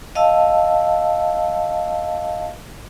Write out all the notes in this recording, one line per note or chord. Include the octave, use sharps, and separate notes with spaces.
D#5 F5 A5 E6